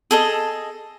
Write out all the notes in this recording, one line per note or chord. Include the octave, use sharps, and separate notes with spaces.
G#4 A4 D#5